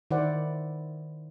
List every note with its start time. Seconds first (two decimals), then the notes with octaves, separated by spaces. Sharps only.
0.11 D#3 E4 C5 D5 F#5